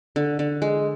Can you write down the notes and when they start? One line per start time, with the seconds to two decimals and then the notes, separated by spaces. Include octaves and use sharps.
0.16 D3
0.39 D3
0.62 G#3